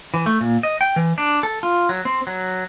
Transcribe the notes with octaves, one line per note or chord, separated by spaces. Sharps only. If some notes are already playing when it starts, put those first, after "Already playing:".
E3
A3
A#2
D#5
G5
E3
D4
A4
F4
F#3
C4
F#3